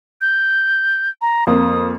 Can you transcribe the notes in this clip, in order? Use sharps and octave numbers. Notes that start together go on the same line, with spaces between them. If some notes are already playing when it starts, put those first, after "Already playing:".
G6
A#5
F2 A#3 D#6